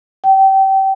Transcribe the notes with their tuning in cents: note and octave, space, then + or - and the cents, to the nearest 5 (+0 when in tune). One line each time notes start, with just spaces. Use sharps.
G5 -25